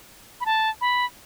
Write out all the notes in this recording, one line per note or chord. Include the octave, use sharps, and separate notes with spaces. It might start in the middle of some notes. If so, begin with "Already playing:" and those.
B5
A5
B5